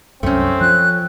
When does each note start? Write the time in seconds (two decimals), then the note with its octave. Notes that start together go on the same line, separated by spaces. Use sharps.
0.23 C2 F#2 A3 C4 C#4
0.61 F3 F#6